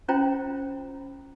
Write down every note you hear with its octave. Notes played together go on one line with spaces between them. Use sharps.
C#4 E4 F4 C5 G5 A#5